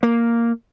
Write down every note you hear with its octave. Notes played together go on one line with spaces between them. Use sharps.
A#3